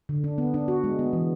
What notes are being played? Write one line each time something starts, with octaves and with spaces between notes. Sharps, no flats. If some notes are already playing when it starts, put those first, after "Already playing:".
D3
D4
B3
D4
F#4
G#3
B3
E3